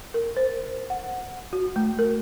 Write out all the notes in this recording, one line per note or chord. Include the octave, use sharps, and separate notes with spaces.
A#4
C5
F#5
F#4
A3
A#4